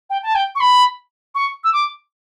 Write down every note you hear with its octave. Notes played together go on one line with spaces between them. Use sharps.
G5
A5
G5
C#6
B5
C#6
E6
D6